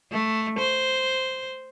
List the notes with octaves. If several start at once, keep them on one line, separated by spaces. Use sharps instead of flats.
A3
C5